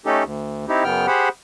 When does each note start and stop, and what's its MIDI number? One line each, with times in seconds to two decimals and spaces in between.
0.06 0.23 57
0.06 0.23 61
0.06 0.23 63
0.06 0.23 67
0.06 0.23 69
0.23 0.66 38
0.68 0.84 60
0.68 0.84 63
0.68 0.84 64
0.68 0.84 67
0.84 1.06 42
0.84 1.06 49
0.84 1.06 59
0.84 1.06 79
0.84 1.06 89
1.07 1.29 67
1.07 1.29 68
1.07 1.29 72
1.07 1.29 78
1.07 1.29 83